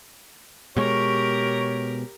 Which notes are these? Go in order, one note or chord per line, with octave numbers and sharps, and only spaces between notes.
B2 G#3 G4 A#4 C#5 C#6